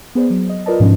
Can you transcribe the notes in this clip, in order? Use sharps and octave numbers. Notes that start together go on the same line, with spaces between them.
B3 G#4 C5 D5
F#3
D#5
F4 A#4 B4 D5 D#5 A5
G#2 B2 F3 G#3 C#4 D4